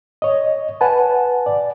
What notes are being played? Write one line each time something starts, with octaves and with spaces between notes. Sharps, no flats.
C#5 D#5
B4 F#5 G#5 A5
D5